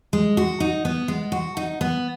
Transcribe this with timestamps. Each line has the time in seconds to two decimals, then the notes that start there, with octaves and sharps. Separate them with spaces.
0.13 G#3
0.37 F#4
0.60 D#4
0.85 B3
1.08 G#3
1.32 F#4
1.57 D#4
1.81 B3